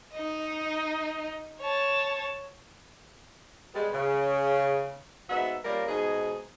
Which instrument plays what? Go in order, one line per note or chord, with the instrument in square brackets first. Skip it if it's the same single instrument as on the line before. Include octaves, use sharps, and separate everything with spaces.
[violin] D#4 D#5
C#5 A5
[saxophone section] G3 G#3 B3
C#3
G#2 B3 D#4 F#4 E5
G3 A#3 C#4 F4 A#4 D5
G#2 B2 D#4 G#4